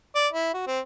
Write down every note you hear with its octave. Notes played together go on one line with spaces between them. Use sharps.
D5
E4
F#4
C4